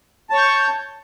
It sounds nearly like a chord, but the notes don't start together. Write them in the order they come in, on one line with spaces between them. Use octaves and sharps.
A5 C#5 C#6 G6